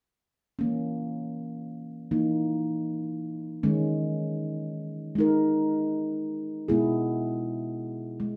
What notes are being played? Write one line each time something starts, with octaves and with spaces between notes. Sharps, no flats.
E3 A#3 C#4
E3 A#3 D#4
D#3 G#3 C#4
G#3 D#4 A#4
B2 G#3 B3 E4 G#4
G#3